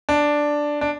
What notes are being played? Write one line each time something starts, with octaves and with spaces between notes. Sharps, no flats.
D4
D4